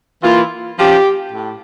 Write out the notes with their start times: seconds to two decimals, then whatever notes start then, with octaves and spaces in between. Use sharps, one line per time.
0.22 E3 A#3 E4 F4
0.78 F3 C#4 F4 G4
1.33 A2